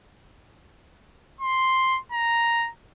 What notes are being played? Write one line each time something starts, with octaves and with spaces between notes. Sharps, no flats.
C6
A#5